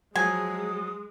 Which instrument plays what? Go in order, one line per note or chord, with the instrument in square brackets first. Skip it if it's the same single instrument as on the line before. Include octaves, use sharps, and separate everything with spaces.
[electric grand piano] F3 F#3 [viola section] G#3 [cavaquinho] G#5 [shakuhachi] D#6